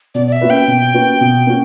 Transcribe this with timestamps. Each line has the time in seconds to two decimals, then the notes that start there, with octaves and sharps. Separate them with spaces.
0.15 B2 D5
0.27 D5
0.32 E5
0.41 A#3 C#4 F#4 B4
0.50 G5
0.68 B2
0.94 A#3 C#4 F#4 B4
1.21 B2
1.47 A#3 C#4 F#4